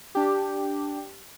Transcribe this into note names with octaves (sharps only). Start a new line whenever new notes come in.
D4 G4